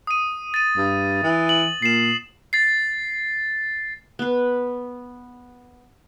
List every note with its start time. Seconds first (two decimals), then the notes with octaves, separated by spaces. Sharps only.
0.07 D#6 D#7
0.54 A6 D#7
0.77 G2
1.23 E3
1.49 F#7
1.82 A#2 C7 E7
2.53 A6 C7
4.19 B3 B4